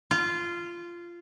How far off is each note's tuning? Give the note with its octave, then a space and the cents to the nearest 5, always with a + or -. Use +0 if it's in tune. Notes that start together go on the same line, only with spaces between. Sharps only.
F4 -15